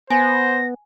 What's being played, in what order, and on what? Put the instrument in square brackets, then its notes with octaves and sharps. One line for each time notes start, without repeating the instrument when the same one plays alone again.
[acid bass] B3 [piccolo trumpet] C5 [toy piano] G#5 [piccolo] A#6